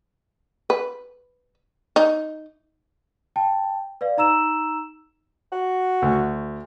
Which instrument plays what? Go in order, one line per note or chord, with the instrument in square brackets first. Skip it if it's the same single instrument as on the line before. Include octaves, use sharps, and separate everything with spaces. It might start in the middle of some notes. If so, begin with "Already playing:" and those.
[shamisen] B4
D#4
[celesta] G5 A5
B4 D5 F5
D#4 A#5 E6 E7
[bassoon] F#4
[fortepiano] D2